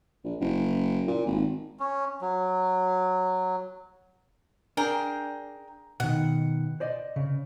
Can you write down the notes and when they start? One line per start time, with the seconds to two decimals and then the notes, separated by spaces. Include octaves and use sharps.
0.24 A#1
0.41 F#1
1.08 A#2
1.27 G#1
1.80 C#4
2.21 F#3
4.77 D4 G#4 A#4 G5
6.00 B2 D#3 F#5
6.80 C5 D5 D#5
7.16 C#3